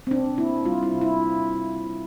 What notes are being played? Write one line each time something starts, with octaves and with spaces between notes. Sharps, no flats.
C4
C3 D4
A#3 E4
G3 F4
E4
C3
E4